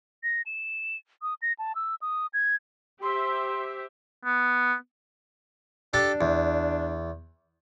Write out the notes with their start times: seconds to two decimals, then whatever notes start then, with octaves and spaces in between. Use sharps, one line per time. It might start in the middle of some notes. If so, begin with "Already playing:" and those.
0.23 A#6
0.46 E7
1.22 D#6
1.42 A#6
1.59 A5
1.75 E6
2.02 D#6
2.33 G#6
3.02 G4 C5 E5 C6
4.25 B3
5.94 D4 G4 A4 A5
6.21 E2